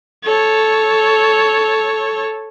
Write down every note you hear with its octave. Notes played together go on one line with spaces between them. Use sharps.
A4 C#5